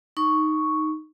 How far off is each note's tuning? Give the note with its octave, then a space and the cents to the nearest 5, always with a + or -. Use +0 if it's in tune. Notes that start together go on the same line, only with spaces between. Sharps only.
D#4 +0 C#6 +0